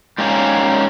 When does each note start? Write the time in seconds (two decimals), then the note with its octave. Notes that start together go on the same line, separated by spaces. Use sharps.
0.18 G#2 G3 A#3 C#4